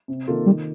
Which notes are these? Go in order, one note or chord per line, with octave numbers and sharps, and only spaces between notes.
C3
D#3 A#3 F4 A4
D#3 G3